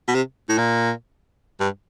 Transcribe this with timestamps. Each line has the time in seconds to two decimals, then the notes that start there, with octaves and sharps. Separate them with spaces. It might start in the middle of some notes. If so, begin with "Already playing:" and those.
0.08 B2
0.15 C3
0.49 A2
0.58 A#2
1.60 G2